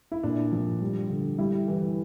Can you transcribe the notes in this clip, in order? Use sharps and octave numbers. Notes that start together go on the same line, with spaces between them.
E4
A#2 D4
F3
G3
D3
G3 E4
E3